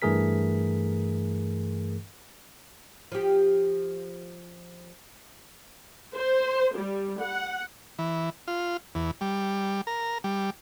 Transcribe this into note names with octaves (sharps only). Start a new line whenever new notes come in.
G2 E3 A3 G#4 A#4 B6
F3 G4
C5
G3
F#5
E3
F4
E2
G3
A#4
G3